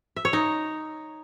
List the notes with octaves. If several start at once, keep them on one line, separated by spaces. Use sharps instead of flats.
E5
C#5
D#4